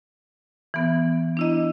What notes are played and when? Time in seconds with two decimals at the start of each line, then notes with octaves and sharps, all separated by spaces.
0.74 E3 B3
1.37 D4 E4 D#5